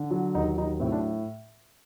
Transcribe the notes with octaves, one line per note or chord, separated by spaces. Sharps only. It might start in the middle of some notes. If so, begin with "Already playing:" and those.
Already playing: D3
F#3
D#2 D#4
F#3 D#4
A2 C4
D4